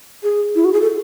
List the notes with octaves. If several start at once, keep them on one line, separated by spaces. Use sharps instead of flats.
G#4
E4
F#4
G#4
A4